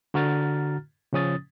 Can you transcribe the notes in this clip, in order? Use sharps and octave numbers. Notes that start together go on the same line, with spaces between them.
D3 F#4 A#5 F6 A6
C#3 F3 C#4 D#6 A6